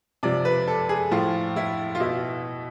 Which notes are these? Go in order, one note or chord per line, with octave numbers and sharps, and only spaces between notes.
C3 F3 D5
B4
A4
G#4
A2 F3 F4
E4
F4
B2 E4